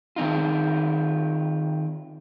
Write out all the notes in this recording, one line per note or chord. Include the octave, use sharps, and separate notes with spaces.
D#3 C4 D#4 F4